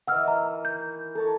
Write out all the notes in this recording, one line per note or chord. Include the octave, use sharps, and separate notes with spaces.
D#3 E3 F#5 E6 F6
A#5
G6
A4 C#5 A5 A#5